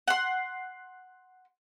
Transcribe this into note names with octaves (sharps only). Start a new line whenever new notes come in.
F#5 C6